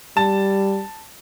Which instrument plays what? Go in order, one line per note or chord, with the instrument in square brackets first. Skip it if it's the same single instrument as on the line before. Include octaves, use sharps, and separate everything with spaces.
[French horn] G3 [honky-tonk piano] A5